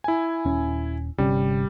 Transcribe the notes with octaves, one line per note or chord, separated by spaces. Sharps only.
E4 G#5
D#1 C#4
G1 C3 G3 C#4